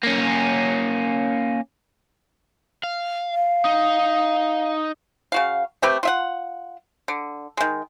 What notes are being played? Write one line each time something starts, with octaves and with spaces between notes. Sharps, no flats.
A#3 C#4
F5
F5
D#4
C#3 F#4 F5
A3 C4 G4 B4
F4 E5 F#5
D3
D#3 G#3